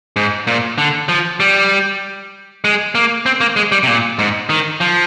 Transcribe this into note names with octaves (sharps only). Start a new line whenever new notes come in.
G#2
A#2
D3
F3
G3
G#3
A#3
C4
A#3
G#3
G3
C3
A#2
G#2
D#3
F3